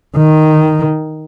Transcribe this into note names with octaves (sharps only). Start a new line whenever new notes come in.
D#3